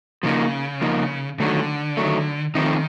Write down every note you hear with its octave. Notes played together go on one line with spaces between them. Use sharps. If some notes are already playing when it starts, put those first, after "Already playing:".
C#3 F3 A#3 D#4
F3 A#3 D#4
D3 D#3 F#3 A3
D#3 F#3 A3
D#3 F3 A3 C4 D#4